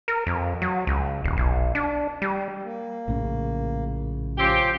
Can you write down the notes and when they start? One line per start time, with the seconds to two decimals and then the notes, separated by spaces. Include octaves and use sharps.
0.08 A#4
0.27 F2
0.62 F#3
0.87 C#2
1.24 D#1
1.37 B1
1.75 D4
2.22 G3
2.62 A#3
3.08 A#1 A2 C#3
4.38 F3 C4 C#4 F4 G4